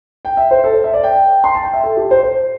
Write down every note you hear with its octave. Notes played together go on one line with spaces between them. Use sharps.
G5
E5
C5
A4
C5
E5
D5
G5
C6
A5
G5
E5
A4
G4
C5
C5